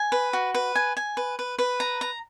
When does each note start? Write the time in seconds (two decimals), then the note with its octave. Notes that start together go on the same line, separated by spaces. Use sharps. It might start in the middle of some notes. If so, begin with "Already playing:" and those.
Already playing: G#5
0.12 B4
0.33 F#4
0.54 B4
0.75 G#5
0.97 G#5
1.17 B4
1.39 B4
1.58 B4
1.80 A#5
2.01 A#5